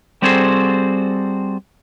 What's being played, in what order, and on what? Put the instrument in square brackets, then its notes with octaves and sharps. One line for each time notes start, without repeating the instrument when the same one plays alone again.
[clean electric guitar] G3 C4 F#4 G#4 A4 C5